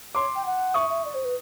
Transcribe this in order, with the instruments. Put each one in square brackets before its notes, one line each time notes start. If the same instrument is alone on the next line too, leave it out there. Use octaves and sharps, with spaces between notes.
[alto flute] C#5 [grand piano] C6 D6
[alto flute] G5
F#5
[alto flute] E5 [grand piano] C#6 D#6
[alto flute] E5
D5
C5
B4